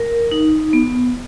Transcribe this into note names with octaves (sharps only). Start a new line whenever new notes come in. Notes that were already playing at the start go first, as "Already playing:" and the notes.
Already playing: A#4
D#4
B3